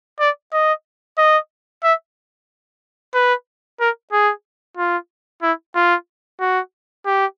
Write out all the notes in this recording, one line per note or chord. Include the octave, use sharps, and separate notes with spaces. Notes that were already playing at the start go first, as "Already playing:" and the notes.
D5
D#5
D#5
E5
B4
A#4
G#4
F4
E4
F4
F#4
G4